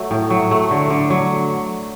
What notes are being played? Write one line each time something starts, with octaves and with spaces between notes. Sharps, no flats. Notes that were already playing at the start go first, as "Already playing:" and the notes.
Already playing: F#3 A3
A2
F#3
A3
D3
D3
F#3